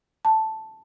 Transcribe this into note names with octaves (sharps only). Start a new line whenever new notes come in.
A5